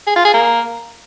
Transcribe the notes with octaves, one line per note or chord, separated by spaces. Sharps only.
G#4
F4
G#4
A#3